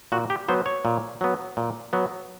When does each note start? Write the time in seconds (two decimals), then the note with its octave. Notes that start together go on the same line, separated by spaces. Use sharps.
0.12 A#2 F#4
0.30 G4
0.49 F#3 B3 C5
0.66 C#5
0.85 A#2
1.21 F#3 B3
1.57 A#2
1.93 F#3 B3